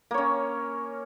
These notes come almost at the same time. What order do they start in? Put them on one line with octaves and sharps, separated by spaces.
A#3 C#5 C#4